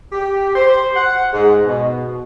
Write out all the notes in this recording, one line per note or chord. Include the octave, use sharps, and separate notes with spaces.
G4
C5
F#5
G#2
B2